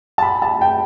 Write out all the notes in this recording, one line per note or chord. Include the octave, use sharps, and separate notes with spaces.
A5
B5
A5
G5